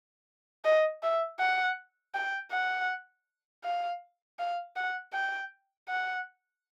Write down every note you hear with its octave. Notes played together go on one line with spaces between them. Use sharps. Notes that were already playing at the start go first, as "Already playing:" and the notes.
D#5
E5
F#5
G5
F#5
F5
F5
F#5
G5
F#5